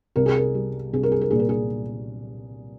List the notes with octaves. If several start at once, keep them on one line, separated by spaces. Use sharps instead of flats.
C2 A#4
G#4
A#4
G3
C2 G#4
A#4
G#4
A#4
A#2 G#4
A#4
G#4